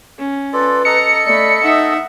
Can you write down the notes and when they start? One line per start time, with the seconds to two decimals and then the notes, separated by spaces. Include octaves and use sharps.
0.19 C#4
0.53 F4 A4 B4 D5
0.85 A4 D#5 A#5 C#7
1.26 A3 D5 B5
1.63 D#4 E5 F#5